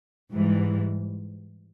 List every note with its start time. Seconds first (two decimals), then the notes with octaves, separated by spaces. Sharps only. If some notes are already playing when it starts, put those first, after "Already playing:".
0.33 G#2 E3 G3